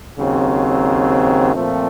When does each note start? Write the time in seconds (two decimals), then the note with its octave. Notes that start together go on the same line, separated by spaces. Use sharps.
0.18 D#2 C#3 F#3 C4
1.54 A#2 F3 A3 C4